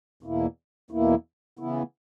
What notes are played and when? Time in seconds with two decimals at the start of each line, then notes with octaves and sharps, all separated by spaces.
0.23 E2 B2 A#3 E4
0.90 E2 B2 A#3 E4
1.59 C#3 E3 B3 E4